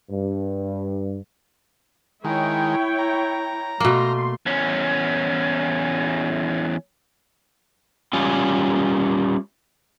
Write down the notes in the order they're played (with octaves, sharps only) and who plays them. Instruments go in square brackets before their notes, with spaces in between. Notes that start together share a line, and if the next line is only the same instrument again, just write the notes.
[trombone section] G2
[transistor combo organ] D#3 G#3 [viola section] E4 C#5 G5
[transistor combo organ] A#5
[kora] B2 A#3 [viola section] A3 C6
[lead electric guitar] E2 C#4
[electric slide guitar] G3 C#4 F4